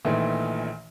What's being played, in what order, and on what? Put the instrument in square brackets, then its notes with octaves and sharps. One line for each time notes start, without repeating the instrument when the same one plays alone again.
[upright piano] A#1 A#2 D#3 E3 A3